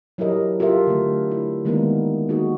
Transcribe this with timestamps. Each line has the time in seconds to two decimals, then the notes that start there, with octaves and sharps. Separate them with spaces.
0.18 F#3 E4 G4 A#4 D#5
0.60 F4 G4 A4 A#4 E5
0.87 D3 A3
1.31 E4
1.65 D#3 G#3 A#3 B3 D#4 A#4
2.29 A#3 D#4 F#4 G#4